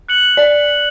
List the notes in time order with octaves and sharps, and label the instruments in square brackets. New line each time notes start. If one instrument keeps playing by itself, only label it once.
[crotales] F#6 C#7 F#7
[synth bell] D5